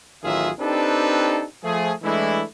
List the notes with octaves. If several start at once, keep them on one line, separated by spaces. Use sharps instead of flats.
A1 D#3 F#3 F4 G#4 E5
C4 D4 D#4 G4 A4 B4
F3 A3 G#4
E3 G#3 A3 D4 E4